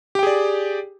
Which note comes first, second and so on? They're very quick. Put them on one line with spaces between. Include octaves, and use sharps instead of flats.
G4 G5 G#4 D5